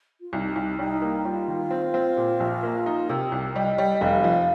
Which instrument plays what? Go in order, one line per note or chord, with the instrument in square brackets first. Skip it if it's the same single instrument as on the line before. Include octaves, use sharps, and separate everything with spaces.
[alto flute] F4
[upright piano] C2 [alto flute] D#4
[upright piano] C2
[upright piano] G3 [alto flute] D#4
[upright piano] A#3
[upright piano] G3 [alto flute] F4
[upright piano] D#3
C4
C4
A#2
A#1
A#3
D#4
[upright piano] C3 [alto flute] A#4
[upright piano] C2
[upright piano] G3 [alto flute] D#5
[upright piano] G3
[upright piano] F1 [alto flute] F5
[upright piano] F3